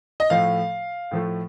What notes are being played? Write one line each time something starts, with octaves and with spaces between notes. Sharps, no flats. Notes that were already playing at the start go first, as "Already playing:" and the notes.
D#5
A2 F3 A3 F5
A2 F3 A3